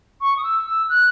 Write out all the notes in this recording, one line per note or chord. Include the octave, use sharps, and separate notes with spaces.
C#6
D#6
E6
E6
F#6